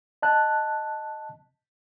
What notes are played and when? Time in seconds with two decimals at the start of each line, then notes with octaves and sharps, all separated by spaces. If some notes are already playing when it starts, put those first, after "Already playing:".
0.22 D#5 A5 F#6